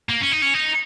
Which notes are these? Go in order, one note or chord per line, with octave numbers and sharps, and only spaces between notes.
A#3
C#4
D#4
C#4
D#4